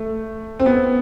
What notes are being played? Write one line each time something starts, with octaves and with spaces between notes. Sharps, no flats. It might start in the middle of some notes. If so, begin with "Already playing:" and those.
Already playing: A3
C4
B3